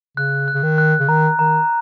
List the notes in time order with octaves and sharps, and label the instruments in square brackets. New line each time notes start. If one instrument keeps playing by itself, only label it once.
[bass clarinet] C#3 [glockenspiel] F#6
[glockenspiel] F#6
[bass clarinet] C#3
D#3
[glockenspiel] F#6
[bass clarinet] C#3
[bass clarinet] D#3 [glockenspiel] A#5
[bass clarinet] D#3 [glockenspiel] A#5